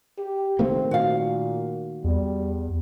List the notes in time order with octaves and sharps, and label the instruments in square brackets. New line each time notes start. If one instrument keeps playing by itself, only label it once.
[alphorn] G4
[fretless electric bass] D#3 A3 A#3 [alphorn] C4
[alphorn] A#2 [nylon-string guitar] F#4 F5
[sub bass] E2 [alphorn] G3